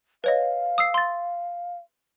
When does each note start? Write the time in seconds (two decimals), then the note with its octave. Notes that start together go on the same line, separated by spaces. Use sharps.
0.24 B4 C#5 D#5 F5
0.78 D#6 E6 C7
0.94 C6 A6